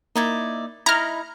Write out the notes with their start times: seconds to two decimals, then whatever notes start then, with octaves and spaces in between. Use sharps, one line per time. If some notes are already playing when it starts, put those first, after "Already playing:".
0.16 A#3 D#4 E4 D5
0.86 D#4 E4 A#5 B5 F6